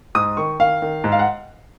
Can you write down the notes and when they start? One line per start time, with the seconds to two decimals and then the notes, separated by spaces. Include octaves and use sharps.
0.15 G#2 D#6
0.37 D#3 C#6
0.60 D#3 F5
0.82 D#3
1.04 G#2
1.12 F5
1.19 F#5